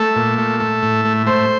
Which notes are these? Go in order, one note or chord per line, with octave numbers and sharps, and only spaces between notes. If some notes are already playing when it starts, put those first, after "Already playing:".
Already playing: A3 A4
A#2
A3
A3
A2
A3
A3 C5